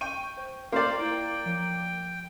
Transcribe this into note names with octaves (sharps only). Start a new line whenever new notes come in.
G5 C#6 D#7
C5
A#3 F4 C5 D5 F5 G5
E4 G5
F3